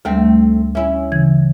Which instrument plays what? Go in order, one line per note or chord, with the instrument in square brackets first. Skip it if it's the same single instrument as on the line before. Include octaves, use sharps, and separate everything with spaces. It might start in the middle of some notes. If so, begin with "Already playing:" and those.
[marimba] D2 G3 [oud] A3 C4
[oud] C#4 E4 [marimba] E5
[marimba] C#3 E3 G#6